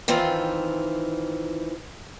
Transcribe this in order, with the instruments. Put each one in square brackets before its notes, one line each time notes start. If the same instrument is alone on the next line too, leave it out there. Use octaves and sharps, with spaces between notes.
[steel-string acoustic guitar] D#3 E3 C4 F4